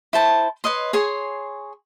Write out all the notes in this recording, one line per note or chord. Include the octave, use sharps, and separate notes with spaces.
E4 C5 A5
B4 C#5 D#5 C6
G#4 C#5 G#5 C6